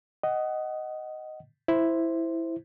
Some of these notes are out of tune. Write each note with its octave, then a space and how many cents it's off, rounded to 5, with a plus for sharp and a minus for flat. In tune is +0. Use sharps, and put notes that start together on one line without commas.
D#5 +0 F#5 +20
E4 +0 C5 -5